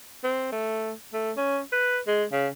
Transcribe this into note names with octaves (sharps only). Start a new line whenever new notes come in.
C4
A3
A3
C#4
B4
G#3
C#3